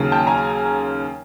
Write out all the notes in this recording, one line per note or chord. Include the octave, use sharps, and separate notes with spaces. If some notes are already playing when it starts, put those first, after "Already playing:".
Already playing: D#2 C#3 F#3
G5 A5
G#5 A#5